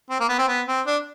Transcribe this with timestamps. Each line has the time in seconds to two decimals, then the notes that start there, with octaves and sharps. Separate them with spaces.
0.10 C4
0.20 A#3
0.29 B3
0.39 C4
0.48 B3
0.68 C4
0.87 D4